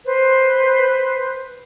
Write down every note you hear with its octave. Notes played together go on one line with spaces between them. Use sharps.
B4 C5